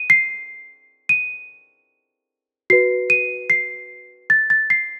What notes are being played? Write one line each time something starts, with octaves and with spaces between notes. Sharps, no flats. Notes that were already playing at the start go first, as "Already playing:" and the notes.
Already playing: D#7
C7
D#7
F#4 B4 C7
D#7
C7
A6
A6
C7